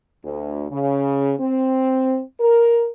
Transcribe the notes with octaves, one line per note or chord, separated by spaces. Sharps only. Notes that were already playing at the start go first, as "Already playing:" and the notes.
D2
C#3
C4
A#4